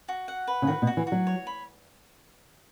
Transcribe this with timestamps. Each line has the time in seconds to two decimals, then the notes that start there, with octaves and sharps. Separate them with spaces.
0.08 F#4
0.28 F#5
0.48 B4
0.62 C#3
0.67 D#3 F#4
0.82 B2
0.87 F#4
0.97 E3
1.07 F#4
1.12 F#3
1.27 C#5
1.47 B5